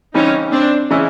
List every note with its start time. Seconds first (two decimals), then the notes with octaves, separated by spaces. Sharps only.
0.14 C#3 E3 G3 C4 C#4 D#4
0.52 C4 D4
0.91 C#3 E3 G#3 C#4 E4